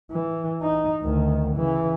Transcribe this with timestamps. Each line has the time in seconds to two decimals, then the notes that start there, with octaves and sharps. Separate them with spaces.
0.10 E3
0.62 D#4
1.03 D2 D#3
1.55 C#3 E3